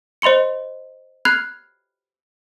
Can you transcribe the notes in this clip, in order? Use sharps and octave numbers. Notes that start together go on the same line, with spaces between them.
C5 D#5 B5 C6 C#7
B5 F6 F#6 G#6 C7